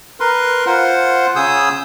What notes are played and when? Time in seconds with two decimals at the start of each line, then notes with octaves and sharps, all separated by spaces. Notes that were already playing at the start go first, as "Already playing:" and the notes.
0.20 A#4 B4 C6
0.67 F4 C5 F#5
1.36 C#3 G#4 D#6 E6 G6